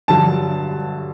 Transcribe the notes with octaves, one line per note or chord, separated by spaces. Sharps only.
G2 D3 F#3 A5